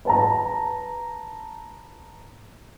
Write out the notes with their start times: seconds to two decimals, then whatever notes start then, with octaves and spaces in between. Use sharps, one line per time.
0.05 B4 A5 A#5